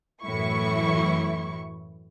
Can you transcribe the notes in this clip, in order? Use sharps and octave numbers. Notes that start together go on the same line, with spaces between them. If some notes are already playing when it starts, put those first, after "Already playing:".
F#2 A2 E3 F#3 E4 C#6